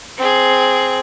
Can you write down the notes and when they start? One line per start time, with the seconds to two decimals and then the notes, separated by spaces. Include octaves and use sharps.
0.17 C4 G#4